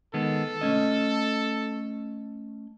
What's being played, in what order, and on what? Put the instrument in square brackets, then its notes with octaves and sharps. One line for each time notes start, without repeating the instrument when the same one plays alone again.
[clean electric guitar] D#3 G#3 B3 [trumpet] A4
[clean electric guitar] A3 C#4 D#5